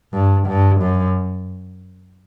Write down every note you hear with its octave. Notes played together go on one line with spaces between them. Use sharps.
G2
G2
F#2